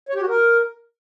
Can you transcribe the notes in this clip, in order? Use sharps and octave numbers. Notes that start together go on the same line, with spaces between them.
C#5
G4
F#4
A#4